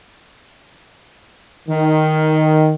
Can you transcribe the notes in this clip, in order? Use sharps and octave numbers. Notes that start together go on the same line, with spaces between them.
D#3